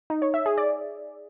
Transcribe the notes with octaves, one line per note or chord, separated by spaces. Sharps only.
D#4
C#5
E5
G#4
D5